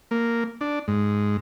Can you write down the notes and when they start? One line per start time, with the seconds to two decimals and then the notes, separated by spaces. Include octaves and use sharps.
0.11 A#3
0.61 D4
0.88 G#2